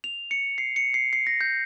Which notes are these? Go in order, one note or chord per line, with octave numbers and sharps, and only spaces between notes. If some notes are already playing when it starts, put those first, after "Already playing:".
F7
C#7
C7
C#7
C7
C7
A#6
G6